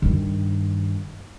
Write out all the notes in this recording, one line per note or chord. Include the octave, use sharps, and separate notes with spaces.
G2 D#3